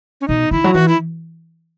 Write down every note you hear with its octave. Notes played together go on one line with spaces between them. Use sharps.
C#4
B2 D#4
D#3 E4
F#3
E3 F#4
E4